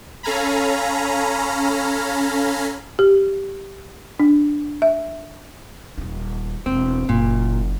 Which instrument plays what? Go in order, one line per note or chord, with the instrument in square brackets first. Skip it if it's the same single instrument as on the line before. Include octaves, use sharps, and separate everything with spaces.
[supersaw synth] C#4 A4 F5 G#5 A#5 B5
[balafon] G4
D4
E5
[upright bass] D#1 D#4
[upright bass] E1 [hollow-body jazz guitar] C4
[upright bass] F#1 [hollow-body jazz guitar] A#2